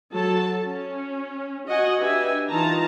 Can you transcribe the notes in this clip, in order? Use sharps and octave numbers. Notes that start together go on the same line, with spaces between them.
F#3 A4 A5
C#4
F#4 D#5 F#5 G#5
D4 G4 B4 E5 G#5
D#3 E3 D#4 F4 A5 A#5